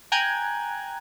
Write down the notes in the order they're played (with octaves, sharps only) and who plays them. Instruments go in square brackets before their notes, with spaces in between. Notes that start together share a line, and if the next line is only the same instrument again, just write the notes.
[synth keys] G5 G#5 A#5 F#6 G#6